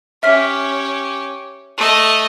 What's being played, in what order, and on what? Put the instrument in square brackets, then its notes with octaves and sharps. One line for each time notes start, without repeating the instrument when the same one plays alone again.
[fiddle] C#4 G4 [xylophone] E5 F6 B6
[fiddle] A3 D#5